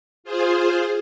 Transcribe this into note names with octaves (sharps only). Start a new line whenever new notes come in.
F4 G#4 C5